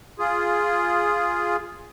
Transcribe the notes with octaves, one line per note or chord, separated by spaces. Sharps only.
F4 G#4